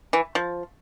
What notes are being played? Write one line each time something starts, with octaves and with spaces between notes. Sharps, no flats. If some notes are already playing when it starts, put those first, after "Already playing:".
E3
F3